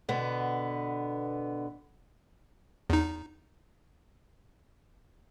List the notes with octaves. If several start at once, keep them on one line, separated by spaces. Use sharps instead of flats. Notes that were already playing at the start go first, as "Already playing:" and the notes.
B2 D3 B3
E2 D#4